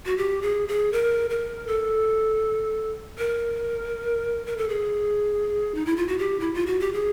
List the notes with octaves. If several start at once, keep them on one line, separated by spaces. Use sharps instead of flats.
F#4
G4
G#4
G#4
A#4
A#4
A4
A#4
A#4
A4
G#4
D#4
E4
F4
F#4
G4
E4
F4
F#4
G4
G#4